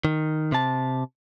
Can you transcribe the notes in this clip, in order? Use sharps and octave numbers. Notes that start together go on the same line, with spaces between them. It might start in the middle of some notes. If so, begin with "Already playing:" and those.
D#3
C3 A5